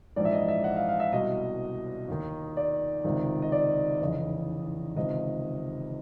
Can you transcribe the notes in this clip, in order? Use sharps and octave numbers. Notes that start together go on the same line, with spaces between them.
A#1 G#2 E3 D5
E5
D#5
E5
F#5
F5
F5
E5
C2 B2 D#5
D#2 D#3
D5
C#2 C3 D#3
D#5
D5
F1 E2 C#3 E3 D#5
C#2 C3 D#3 D#5